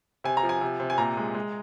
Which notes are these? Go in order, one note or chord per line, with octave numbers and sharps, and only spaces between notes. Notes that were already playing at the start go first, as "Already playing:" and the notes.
C3 G#5
A#5
F3
G#5
C3
C3
G#5
A#2 A#5
G#3
G#3